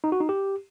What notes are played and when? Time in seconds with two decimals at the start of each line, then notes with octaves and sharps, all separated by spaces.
0.04 D#4
0.12 F#4
0.21 D#4
0.29 G4